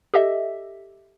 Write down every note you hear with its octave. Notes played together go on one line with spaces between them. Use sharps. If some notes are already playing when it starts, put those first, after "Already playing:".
G4 A4 D#5 E5